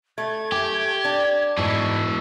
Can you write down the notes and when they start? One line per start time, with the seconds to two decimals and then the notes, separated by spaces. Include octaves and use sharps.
0.18 A3 G#6
0.52 G4 G#5
1.05 D4
1.57 G#2 B2 E3 A5